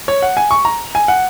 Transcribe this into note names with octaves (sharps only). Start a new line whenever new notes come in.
C#5
F#5
G#5
C#6
A#5
G#5
F#5